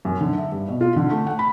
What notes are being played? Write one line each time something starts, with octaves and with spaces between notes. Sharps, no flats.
F#2
D3
E5
G2
B2
F4
D3
A3
F#5
B5